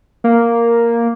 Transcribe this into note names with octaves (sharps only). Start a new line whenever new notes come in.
A#3